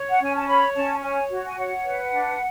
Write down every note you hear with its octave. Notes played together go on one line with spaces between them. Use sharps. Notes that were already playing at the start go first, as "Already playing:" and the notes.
Already playing: C#5
F#5
C#4 G#5
A5
C#5 B5
C#4 A5
C#5 G#5
F#4
G#5
C#5 F#5
B4
D4